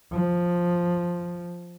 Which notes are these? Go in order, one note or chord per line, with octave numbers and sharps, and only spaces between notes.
F3